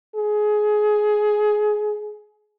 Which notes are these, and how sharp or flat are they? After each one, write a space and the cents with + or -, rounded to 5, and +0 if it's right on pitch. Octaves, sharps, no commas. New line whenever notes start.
G#4 +20